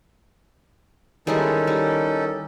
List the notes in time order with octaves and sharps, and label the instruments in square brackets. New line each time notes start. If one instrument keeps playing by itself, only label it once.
[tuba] D#3 [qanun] G3 G#3 E4 [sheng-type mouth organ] C#4 D#4 A4
[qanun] G3